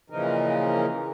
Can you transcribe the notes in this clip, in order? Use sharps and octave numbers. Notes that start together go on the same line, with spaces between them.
A#2 C#3 E3 F3 D#4 A#4